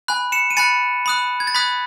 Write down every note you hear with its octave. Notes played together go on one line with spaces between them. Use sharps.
G#5 B5 F#6
C#7 E7
D#7
G#5 B5 F#6 A6 C#7
B5 D#6 F#6
G#6
A6
B5 D#6 F#6 G#6 B6